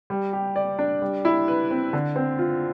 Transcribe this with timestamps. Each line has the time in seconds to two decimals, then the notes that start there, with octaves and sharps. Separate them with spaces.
0.10 G3
0.33 G4
0.56 D5
0.79 D4
1.02 G3
1.25 E4
1.48 B4
1.71 C4
1.93 D3
2.16 C4
2.39 F4